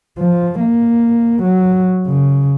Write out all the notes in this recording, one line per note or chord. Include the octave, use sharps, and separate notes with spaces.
F3
A#3
F#3
C#3